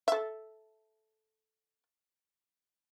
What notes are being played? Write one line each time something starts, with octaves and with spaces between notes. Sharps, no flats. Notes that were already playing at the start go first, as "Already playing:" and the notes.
A4 E5